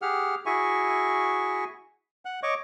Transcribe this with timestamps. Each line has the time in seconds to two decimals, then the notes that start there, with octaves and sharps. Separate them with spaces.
0.02 G4 G#4 F#5 F6
0.46 E4 F#4 G#4 E5 G#5 C#6
2.25 F#5 F#6
2.43 C#5 D#5 C#6 D6